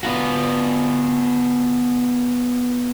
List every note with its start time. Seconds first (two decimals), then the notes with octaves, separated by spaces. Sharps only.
0.03 B3 F4 F#4